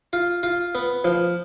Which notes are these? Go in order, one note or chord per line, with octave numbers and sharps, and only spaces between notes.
F4
F4
B3
F3